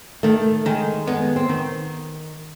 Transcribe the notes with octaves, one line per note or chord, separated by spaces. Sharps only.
D#3 A3
D#3 G#3
G#3 B3
C4
D#3